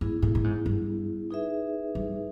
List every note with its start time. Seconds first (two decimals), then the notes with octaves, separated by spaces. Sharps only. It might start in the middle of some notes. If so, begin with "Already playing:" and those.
0.01 G#2 B3 E4 G#4
0.22 A2
0.35 A2
0.44 G#2
0.66 G2
1.31 D#4 G#4 B4 E5
1.95 G2